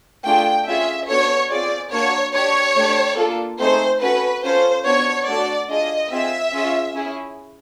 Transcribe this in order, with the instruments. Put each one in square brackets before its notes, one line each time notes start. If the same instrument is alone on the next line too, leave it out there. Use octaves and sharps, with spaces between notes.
[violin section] A3 D4 F4 G#4 G5
C#4 F4 G#4 E5
B3 D4 F#4 A4 C#5
C4 F4 G#4 D5
A#3 D4 F#4 C#5
D4 G4 C#5
A3 D4 G4
A#3 D4 F4 A4
A3 C4 D#4 G#4 C5
C#4 F#4 A4 B4
C#4 F4 A4 C5
B3 D4 F#4 C#5
A3 D4 F#4 A4 D5
D4 F4 G#4 D#5
C4 F4 G#4 E5
C#4 F4 G#4
C#4 E4 G#4